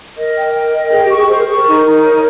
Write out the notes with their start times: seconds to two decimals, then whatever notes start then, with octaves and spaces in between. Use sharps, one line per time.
0.18 A#4 D#5
0.36 G5
0.54 G5
0.73 D#5
0.92 G#4 G5
1.04 G4
1.10 C#6
1.17 G#4
1.29 G#4 C5
1.38 A#4
1.48 G#4 C#6
1.57 A#4
1.67 D#4
1.85 D#4
2.04 C#5